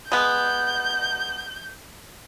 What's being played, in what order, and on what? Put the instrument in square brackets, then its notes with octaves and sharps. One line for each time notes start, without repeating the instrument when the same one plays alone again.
[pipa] G#3 B3 [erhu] G6